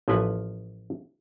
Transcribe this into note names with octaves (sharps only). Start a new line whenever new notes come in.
A1 F3 A#3 F4 B4 G#5